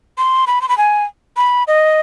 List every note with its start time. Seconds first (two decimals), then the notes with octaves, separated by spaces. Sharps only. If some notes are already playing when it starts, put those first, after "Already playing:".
0.18 C6
0.47 B5
0.62 C6
0.69 B5
0.78 G#5
1.37 B5
1.68 D#5